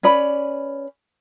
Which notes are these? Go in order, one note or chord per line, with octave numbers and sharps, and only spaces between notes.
C#4 B4 D5 B5